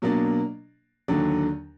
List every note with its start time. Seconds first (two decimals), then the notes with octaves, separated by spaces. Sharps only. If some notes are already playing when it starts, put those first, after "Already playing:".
0.02 B2 F#3 A#3 D4
1.08 D#2 D3 F#3 D4